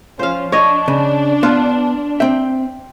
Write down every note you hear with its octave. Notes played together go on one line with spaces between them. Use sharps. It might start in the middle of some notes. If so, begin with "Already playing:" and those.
F3 C#4 F4 C5 F5
D4 C#5 D#5
C#3
B3 F4
C4 E5 G5